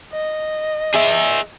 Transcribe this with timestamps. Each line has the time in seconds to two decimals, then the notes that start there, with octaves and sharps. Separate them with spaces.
0.12 D#5
0.95 G#4 E5